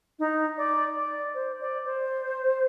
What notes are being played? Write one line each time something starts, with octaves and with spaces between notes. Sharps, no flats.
D#4
D5
D5
C5
D5
C5